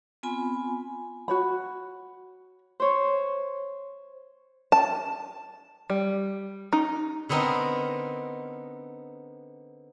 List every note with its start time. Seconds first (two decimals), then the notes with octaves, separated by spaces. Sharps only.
0.23 B3 C4 F4 G#5 B5
1.28 F#4 C#5 B5
2.80 C5 C#5
4.72 A5
5.90 G3
6.73 D#4
7.29 D3 B3 C4 D#4 A#4